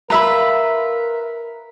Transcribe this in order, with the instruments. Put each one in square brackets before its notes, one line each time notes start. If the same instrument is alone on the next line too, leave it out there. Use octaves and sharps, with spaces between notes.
[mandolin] F4 B4 E5 [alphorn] A#4 [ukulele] A#5 B5